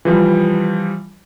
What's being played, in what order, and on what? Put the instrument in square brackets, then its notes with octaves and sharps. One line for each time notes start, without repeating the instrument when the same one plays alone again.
[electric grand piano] E3 F3 G3